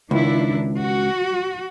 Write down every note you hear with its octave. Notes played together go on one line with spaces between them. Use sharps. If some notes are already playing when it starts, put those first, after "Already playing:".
C#2 D#3 D4 E4
F#4